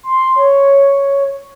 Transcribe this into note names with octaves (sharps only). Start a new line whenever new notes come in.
C6
C#5